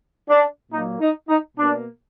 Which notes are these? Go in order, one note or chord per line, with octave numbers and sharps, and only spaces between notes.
D4
A#2 F#3 A#3 D#4
D#4
D#4
B2 A#3 D4